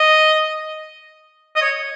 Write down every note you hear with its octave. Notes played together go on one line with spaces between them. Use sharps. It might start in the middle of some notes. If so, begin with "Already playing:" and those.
Already playing: D#5
D#5
C#5